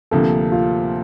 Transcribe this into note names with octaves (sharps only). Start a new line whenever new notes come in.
D2 C3 F3 A#3 A4
F4